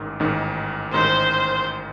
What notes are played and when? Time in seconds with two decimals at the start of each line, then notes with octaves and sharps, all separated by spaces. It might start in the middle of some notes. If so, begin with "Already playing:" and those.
Already playing: A1 G#2 D#3
0.20 A1 G#2 D#3
0.93 A1 G#2 D#3 C5